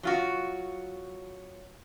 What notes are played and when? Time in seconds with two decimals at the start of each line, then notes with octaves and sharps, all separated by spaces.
0.03 F#3 F4 F#4